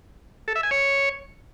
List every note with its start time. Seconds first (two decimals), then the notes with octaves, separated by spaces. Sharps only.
0.48 A4
0.56 E5
0.63 G#5
0.71 C#5